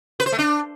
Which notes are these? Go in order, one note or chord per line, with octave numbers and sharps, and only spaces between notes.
B4
C5
A3
D4